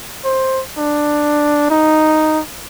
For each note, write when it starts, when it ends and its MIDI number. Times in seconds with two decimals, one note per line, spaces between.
0.24 0.62 72
0.78 1.67 62
1.70 2.40 63